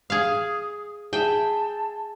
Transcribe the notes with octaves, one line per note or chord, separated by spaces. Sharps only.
G#4 F5 D#6
G#4 E5 G5 A5